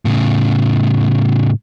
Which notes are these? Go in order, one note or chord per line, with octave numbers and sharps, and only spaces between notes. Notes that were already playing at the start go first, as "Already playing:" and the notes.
A2 C#3